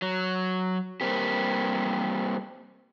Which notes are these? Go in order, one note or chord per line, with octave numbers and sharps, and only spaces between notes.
F#3
G3 A#3 C4 G4